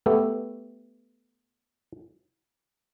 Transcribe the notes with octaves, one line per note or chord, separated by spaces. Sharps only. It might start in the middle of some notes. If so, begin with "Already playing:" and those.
A3 B3 G4 A4